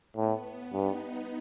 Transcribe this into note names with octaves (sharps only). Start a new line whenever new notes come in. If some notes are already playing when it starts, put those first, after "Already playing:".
A2 B3
G2 D#4